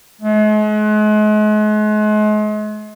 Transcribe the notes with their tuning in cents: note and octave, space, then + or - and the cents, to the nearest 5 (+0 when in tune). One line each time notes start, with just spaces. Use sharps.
G#3 +40